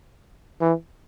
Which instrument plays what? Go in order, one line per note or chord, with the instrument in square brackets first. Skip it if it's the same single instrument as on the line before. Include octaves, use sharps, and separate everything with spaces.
[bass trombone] E3